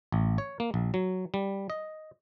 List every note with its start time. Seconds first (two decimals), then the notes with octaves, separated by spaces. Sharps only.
0.12 A1
0.38 C#5
0.60 A#3
0.74 A#1
0.94 F#3
1.34 G3
1.70 D#5